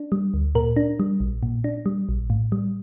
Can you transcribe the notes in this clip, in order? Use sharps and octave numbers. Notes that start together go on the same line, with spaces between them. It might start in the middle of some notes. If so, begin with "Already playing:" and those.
Already playing: D4
G3
D2
A#2 A#4
D4
G3
A#1
A#2
D4
G3
A#1
A2
G3